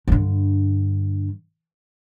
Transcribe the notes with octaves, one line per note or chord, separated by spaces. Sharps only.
G2 D3